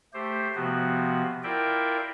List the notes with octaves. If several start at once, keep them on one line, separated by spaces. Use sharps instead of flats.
A3 G4 C5
C3 F3 B3 F#4
E4 F4 A#4 D5 E5 G5